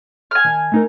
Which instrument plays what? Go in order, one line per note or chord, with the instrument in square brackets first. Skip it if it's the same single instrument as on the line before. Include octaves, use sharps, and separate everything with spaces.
[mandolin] G#5 F6
[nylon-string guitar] D#3 A5
A3 D#4 A#4